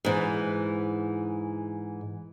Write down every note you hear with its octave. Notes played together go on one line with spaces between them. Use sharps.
G#2 E3